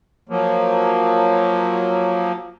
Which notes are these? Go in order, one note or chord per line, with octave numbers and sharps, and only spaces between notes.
F3 F#3 A#3